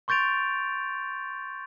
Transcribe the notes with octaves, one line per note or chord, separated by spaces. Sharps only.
C6 C#6 G6 A6 D7 F7